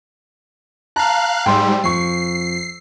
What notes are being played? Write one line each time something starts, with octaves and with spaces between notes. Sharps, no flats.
F5 A5 A#5 F#6
G#2 G3 G5 C6 E6
F2 C#6 C7